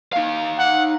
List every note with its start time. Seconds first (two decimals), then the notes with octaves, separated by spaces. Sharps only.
0.12 D#4 F5
0.59 F#5